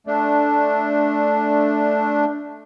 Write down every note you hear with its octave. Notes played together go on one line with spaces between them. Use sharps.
A3 D4